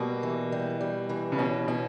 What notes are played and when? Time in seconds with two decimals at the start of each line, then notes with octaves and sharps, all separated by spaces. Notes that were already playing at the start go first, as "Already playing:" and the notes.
Already playing: B2 G3 A#3
0.23 E3
0.52 G3
0.81 G3
1.09 E3
1.32 C#3
1.38 B2 C#4
1.68 B2 C#4